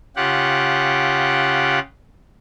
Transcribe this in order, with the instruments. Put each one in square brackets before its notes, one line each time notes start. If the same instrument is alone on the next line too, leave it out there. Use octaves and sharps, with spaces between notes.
[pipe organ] C#3 F4 G4 F#5